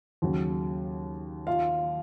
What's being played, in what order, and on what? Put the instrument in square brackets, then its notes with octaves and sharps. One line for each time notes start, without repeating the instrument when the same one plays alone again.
[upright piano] D#2 C#3 F#3
[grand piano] F4 F5